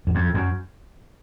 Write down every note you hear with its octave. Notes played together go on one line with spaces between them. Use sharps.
F#2
F2
F#2